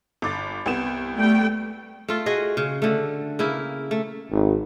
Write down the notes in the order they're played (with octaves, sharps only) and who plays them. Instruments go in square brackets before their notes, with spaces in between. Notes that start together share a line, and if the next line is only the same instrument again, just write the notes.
[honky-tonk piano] G1 D6 A6
C2 B3 E7
[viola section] G3 A3 G5
[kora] A3 F4
F#4 G#4 D#5
C#3
D3 A3
C#3 A#3 E4
A3
[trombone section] G#1